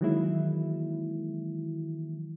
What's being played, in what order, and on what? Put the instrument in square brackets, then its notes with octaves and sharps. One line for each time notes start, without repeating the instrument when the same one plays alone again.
[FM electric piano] D#3 E3 F#3 G#3 A#3 E4